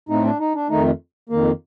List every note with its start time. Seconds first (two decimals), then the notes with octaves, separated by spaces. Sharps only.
0.09 A2 A3 C4 D#4
0.24 D4
0.39 D#4
0.54 D4
0.69 F2 D#3 A3 D#4
1.29 F2 D#3 A#3